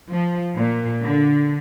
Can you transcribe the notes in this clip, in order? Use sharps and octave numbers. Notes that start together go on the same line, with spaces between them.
F3
A#2
D3